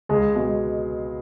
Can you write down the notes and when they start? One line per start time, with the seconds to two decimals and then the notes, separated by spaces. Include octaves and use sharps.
0.09 C#2 G#3 G#4
0.35 B2 G#3